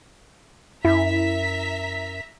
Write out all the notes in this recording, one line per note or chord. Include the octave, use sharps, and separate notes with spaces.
F#2 E4 E5 A#5 B6